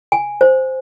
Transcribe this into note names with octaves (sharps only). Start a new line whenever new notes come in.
G#5
C5